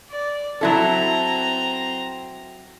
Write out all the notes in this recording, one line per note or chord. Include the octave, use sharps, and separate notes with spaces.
D5
F#3 C4 E4 A4 A#5